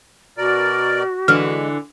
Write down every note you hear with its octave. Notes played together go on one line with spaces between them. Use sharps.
B2 F#4 A#4 D5
D3 E3 G#3 F6